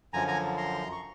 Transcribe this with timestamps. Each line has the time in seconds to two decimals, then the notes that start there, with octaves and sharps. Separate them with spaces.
0.13 F#2 D3 F3 G#5 A#5
0.28 G#5 A#5
0.57 A#5 C6
0.92 C#6